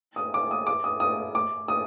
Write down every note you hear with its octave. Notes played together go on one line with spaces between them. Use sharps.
D#6
D6
D#6
D6
D#6
D#6
D6
D#6